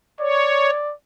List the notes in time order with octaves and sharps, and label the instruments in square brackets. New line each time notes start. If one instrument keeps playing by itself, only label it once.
[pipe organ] C#5 [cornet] D5